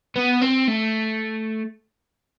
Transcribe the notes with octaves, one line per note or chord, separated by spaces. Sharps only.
B3
C4
A3